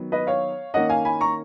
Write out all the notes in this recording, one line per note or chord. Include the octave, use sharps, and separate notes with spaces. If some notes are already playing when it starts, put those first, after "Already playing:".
Already playing: D#3 F#3 B3
B4 D#5
C#5 F5
D#3 A#3 C#4 D#5 F#5
F5 G#5
G#5 B5
A#5 C#6